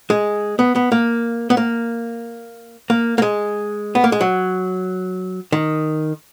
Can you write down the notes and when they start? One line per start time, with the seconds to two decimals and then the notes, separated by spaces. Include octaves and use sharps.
0.10 G#3
0.59 B3
0.76 B3
0.92 A#3
1.50 B3
1.57 A#3
2.90 A#3
3.18 A#3
3.22 G#3
3.95 B3
4.04 A#3
4.12 G#3
4.21 F#3
5.52 D#3